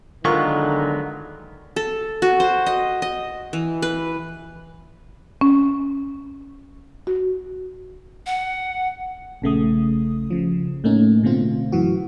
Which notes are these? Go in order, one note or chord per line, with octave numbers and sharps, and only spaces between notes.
D3 D#3 F#3 G#3 B3 F4 A#4 C#6
A4
F#4
C5
D#5
D#5
E3
B4
C#4
F#4
F#5
A#1 C#3 A3 D#6
C#3 F3
A2 A3 A#3 C#4 D#4
B2 D3 A3 C4 F4
F#2 E3 F#4